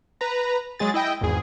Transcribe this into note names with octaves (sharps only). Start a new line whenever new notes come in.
B4 A#5
F#3 G#3 G#4 A6
E4 D#5 G5
G#1 E2 G#4